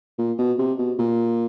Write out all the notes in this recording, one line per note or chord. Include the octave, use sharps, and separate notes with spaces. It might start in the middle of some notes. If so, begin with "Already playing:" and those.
A#2
B2
C3
B2
A#2